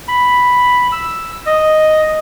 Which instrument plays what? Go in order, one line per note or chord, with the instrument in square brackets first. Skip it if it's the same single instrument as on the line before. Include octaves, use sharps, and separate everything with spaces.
[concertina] B5
E6
D#5